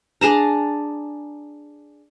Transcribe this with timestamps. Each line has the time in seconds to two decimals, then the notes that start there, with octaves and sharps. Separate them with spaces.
0.21 D4 G#4 A5 A#5